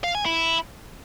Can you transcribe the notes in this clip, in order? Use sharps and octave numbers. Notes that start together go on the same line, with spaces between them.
F5
G#5
E4